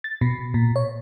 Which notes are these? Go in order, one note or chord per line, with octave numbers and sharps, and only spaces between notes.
A6
B2
A#2
C#5